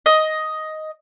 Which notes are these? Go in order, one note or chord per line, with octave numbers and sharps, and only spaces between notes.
D#5